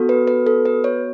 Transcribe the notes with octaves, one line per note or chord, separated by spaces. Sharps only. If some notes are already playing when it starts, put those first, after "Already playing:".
Already playing: B3 F#4 A4
B4
B4
A4
B4
C#5